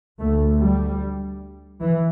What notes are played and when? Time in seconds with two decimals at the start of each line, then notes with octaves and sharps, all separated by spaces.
0.19 D2 A3
0.59 G3
1.81 E3